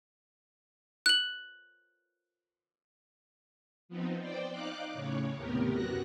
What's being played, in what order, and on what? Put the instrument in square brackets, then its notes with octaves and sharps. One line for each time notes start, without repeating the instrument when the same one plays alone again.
[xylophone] F#6 F#7
[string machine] F3 B3 C4 D#4
C5 D5 G5
D#4 F5 D6 F#6
A2 C#3 C#5
D#2 A2 C3 B3 G4 A#4
F#2 B3 F#4 F#6 A#6